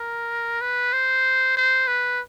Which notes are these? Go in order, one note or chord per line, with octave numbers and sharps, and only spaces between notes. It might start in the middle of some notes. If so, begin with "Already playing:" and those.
Already playing: A#4
B4
C5
C5
B4